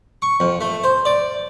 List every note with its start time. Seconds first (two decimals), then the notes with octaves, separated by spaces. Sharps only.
0.22 C#6
0.40 F2
0.61 A3
0.84 C5
1.05 D5